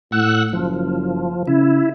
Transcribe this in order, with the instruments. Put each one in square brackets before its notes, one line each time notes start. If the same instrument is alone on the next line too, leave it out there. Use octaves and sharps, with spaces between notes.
[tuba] A2 [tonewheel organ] F#5 E6 F#6
[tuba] F#1 [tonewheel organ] F3
[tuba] C#3 [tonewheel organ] E4